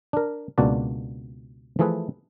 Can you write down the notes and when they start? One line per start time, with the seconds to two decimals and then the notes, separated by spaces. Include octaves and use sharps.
0.13 D4 A#4
0.58 C#2 B2 A#3 D4 F#4 D5
1.79 E3 F3 A3 G#4 A4 B4